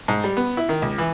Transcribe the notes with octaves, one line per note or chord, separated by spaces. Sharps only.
G#2
G3
B3
E4
D#3
C#2
E3